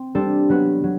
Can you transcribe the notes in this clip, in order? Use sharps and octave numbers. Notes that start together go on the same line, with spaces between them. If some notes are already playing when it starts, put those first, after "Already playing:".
Already playing: C4
G3 D4 A4 C5
F#3 B3 F#4 B4
F#3